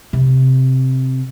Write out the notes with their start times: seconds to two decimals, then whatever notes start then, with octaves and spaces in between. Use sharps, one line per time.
0.13 C3